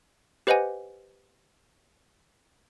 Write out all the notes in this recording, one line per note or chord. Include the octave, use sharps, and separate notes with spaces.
G4 B4 C5 D#5 F#5 G#5